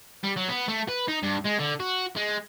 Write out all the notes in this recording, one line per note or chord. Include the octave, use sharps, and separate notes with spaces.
G3
F#3
B3
A3
B4
D#4
G2
G#3
D3
F#4
G#3